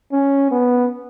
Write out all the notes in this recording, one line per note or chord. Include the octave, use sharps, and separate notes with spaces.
C#4
B3